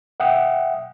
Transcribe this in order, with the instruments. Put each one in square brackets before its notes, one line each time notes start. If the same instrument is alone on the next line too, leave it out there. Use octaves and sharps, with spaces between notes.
[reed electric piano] E5 F#5 G5 D#6